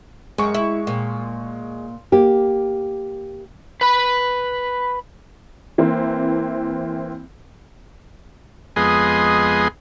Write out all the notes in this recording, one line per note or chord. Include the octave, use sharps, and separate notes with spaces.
F#2 G#3 C#6
E4
A#2
A#3 G4
B4 B5
E3 A#3 C4
F2 G#3 B3 G#4 D#5 C6